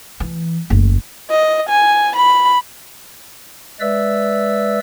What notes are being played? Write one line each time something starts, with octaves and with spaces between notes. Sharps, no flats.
E3
F#1 D2
D#5
G#5
B5
G#3 B4 D5 E5 E6